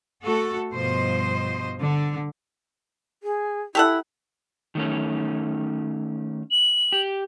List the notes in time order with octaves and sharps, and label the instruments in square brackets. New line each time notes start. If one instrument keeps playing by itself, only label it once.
[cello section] A3 F#4 A4
G2 B2 F3 C5 D#5
D3
[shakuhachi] G#4
[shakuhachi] E4 [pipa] G4 A4 F#5
[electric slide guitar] D#3 A3 C#4
[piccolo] F#7
[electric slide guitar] G4